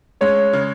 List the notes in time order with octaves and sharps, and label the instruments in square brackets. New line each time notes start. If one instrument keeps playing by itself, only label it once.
[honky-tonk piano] G#3 [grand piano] C#4 C#5
[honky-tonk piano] C#3